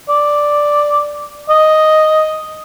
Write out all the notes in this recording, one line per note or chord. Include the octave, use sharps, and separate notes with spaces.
D5
D#5